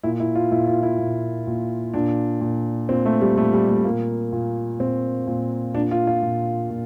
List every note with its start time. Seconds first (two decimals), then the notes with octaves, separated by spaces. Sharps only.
0.03 A#2 E4
0.20 E4
0.35 F4
0.52 A#2 E4
0.67 F4
0.83 E4
0.98 A#2
1.47 A#2
1.94 A#2 D4
2.41 A#2
2.89 A#2 C4
3.06 A3
3.21 G3
3.37 A#2 A3
3.53 G3
3.69 A3
3.85 A#2 A#3
4.33 A#2
4.80 A#2 C4
5.27 A#2
5.74 A#2 D4
5.91 F4
6.07 F4
6.23 A#2
6.70 A#2